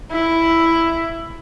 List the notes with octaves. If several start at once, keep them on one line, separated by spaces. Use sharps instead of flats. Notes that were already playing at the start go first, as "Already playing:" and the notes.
E4